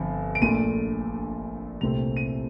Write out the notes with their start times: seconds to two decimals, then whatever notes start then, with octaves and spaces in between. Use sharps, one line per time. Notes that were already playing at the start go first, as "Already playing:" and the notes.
Already playing: G1 G2 F3 C4
0.35 D7
0.41 A#1 A#2 A3 D#7
1.81 C2 A#2 A3 C4 F7
2.17 D#7